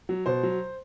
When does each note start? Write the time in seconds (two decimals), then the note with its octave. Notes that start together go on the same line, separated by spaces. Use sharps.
0.09 F#3
0.26 B2 C5
0.43 F#3